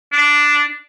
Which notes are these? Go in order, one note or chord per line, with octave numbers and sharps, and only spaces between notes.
D4